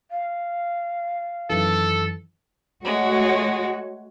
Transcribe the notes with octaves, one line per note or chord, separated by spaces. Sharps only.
F5
F#2 D#3 E3 A4
G#3 A3 F#4 C#5